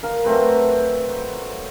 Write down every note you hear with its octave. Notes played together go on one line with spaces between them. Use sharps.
A#4 F5 A#5
F#3 A3 C4 B4